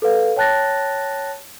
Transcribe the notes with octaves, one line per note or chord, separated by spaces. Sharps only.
A4 B4 F5
C#5 G5 A5 F#6 A6 A#6